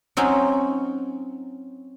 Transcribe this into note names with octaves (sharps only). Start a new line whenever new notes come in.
F#3 C4 C#4 D#4 F#4